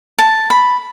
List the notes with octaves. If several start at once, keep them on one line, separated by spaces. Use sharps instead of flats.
A5
B5